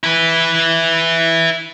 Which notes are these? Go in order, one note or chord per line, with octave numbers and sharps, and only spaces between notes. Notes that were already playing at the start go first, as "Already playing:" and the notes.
E4 B4